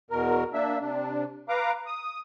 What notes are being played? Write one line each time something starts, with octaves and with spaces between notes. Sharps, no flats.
E2 B2 A#4
A#3 D4 E5
C3 D4
B4 F5 A#5 D6
D#6